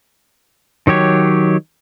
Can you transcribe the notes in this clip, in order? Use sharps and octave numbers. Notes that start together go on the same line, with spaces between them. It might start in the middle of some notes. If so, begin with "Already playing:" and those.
D#3 F#3 G4 C#5